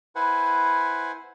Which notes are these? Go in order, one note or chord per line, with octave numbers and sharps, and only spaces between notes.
E4 B4 C5 F#5 G#5